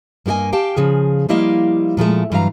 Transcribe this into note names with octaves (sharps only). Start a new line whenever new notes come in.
G2 A#3 G4 D#5 G#5
G4 F5 G5 A5
C#3 F3 G#4
F3 G3 A#3 E4 D#5 F5
A#2 F3 G#3 A3
G2 E3 F#3 F5 A#5